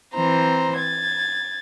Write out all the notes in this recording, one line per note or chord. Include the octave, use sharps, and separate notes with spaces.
E3 C4 C5 A#5
G#6 A6